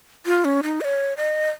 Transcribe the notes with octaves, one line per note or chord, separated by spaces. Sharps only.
F4
C#4
D#4
D#5
C#5
D#5